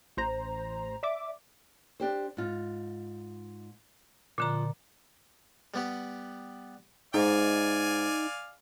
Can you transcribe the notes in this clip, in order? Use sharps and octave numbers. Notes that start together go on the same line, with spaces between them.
A1 C5 A#5
D5 E5 D6
D4 G4 C5
G#2 F4
A#2 D3 F3 A#5
G3 B3 G4
G#2 D#4 D5 F5 G#5